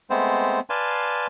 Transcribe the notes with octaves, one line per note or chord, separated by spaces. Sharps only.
G#3 A3 B3 C4 C5
B4 D5 F5 G#5 A5 C6